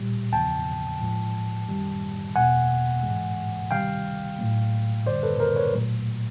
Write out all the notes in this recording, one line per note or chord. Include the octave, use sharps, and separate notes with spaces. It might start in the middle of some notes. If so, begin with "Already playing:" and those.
Already playing: A#2 G3
E2 C#3 F3 G5 A5
A2 F3 G#3
F#2 D#3 G3
E2 B2 G#3 F#5 G#5
G#2 E3 G#3
C3 D#3 G3 F5 G5
A2 F#3 A3
F#2 D3 G3 C5 D5
A4 B4
A#4 C5
B4 C#5
A#2 F#3 A3